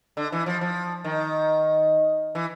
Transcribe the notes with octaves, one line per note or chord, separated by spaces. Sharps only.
D3
E3
F3
F3
D#3
E3